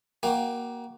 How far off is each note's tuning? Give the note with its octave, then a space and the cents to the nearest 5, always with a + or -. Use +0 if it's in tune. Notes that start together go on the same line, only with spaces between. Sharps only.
A#3 +20 F#4 +30 G5 +20